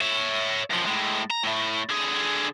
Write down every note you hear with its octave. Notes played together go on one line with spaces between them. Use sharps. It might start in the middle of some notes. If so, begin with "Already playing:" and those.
C#5 E5
F#2 F3
A2 G#3
A#5
A2 A3
D3 G#4